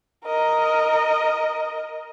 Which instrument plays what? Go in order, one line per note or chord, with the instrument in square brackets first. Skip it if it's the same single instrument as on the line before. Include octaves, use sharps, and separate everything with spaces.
[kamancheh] A#4 D#5